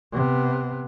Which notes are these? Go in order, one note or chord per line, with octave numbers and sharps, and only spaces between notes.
C3 B3